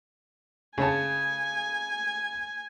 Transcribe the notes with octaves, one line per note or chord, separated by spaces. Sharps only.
C#3 C#5 G#5 A5